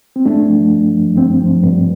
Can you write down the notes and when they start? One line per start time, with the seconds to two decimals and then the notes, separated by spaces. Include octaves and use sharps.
0.16 C4
0.26 G2 A3 D4
0.49 F3
0.72 G2
0.94 F3
1.17 G2 C4
1.40 F3
1.63 G2